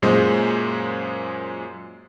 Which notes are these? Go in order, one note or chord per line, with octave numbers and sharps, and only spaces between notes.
F#2 A#2 G#3 C5